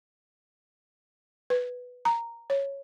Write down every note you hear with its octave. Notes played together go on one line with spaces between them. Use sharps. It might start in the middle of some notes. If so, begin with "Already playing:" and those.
B4
A#5
C#5